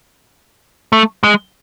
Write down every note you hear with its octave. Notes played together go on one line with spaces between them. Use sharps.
A3
G#3